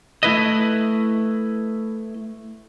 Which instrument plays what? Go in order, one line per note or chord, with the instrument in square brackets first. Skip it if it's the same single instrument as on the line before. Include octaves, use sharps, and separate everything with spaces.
[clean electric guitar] A3 E4 B4 D#5